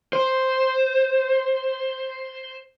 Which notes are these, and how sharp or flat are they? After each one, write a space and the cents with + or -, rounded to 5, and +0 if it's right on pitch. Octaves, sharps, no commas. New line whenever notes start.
C5 +5